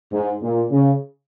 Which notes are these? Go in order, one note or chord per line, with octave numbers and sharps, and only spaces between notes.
G#2
A#2
C#3